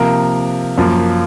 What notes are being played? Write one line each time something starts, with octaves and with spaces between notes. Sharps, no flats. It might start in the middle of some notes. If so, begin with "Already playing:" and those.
Already playing: C3 F3 A#3 A#4
F#2 F3 A#3